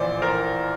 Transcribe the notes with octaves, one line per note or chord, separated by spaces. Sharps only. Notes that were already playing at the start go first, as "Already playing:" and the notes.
Already playing: A#1 A2 E3 C5 D5
A#4 C5